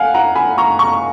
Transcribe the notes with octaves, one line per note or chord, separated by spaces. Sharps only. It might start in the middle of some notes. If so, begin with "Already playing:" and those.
Already playing: F5 F#5 G#5
F#5 A#5
G#5 B5
A#5 C#6
A#5 C#6